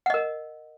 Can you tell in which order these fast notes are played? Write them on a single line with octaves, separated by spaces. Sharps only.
F#5 D#5 A#4